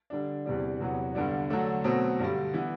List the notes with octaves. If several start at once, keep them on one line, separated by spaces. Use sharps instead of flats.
D3 G3 D4
E2 C3 G3 D4
E2 C3 F#3 B3
G2 D3 G3 B3 D4
D3 F#3 A3 D4
B2 F#3 A3 C4
G2 D3 G3
E3 B3